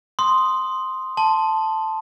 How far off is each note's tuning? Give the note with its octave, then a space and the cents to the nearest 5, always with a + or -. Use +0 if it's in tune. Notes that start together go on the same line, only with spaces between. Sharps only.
C6 +0 D#6 +0
A5 +0 C6 +0